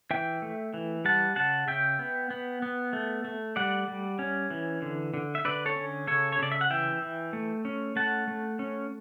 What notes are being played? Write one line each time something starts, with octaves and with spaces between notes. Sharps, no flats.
E3 E5 G5
A3
E3
G3 F#5 A5
C#3 F#5 A5
C#3 E5 G5
B3
B3
B3
A3
A3
G3 D5 F#5
G3
C#4
E3
D3
D3
E5
D3 B4 D5
A4 C#5
C#4
C#3 A4 C#5
C#5
C#3 D5
E5
F#5
E3 E5 G5
E3
A3
C#4
A3 F#5 A5
A3
C#4